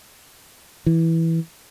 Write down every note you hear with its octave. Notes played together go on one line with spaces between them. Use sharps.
E3